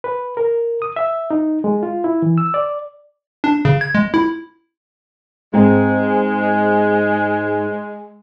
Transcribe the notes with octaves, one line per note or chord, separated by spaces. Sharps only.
B4
A#4
D#6
E5
D#4
G#3
F4
E4
E3
E6
D5
D4
C#3
G#6
G#3
E4
G#2 G#3 C4